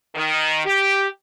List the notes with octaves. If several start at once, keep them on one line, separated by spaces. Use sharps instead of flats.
D#3
G4